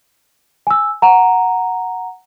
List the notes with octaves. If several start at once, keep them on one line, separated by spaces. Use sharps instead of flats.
G#5 E6
F#5 A#5